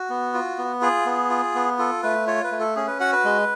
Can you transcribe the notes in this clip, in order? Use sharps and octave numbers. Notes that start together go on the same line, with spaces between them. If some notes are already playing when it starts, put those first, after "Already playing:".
Already playing: F#4
B3
F4
B3
F4 G#4
B3
F4
B3
F4 A4
A3 B4
F4 C#5
B4
A3
A4
C#4 G#4
B4
F#4 F#5
B4
G#3